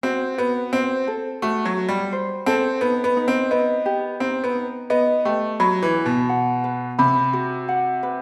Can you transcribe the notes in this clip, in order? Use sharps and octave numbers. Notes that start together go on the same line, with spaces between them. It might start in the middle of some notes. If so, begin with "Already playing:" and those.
C4 F#4
B3 F#4
C4 C5
A4
A3 F#4
F#3
F#4
G3
C5
C4 A4
B3 D#4
B3
D#4
C4
B3 D#5
G4
C4 D#4
B3
D#4
B3 D#5
A3 G4
F#3 B5
E3
F#4
B2
F#5
B4
C3 B5
F#4
F#5
B4